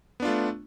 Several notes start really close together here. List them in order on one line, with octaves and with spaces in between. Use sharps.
B3 D4 F4 A3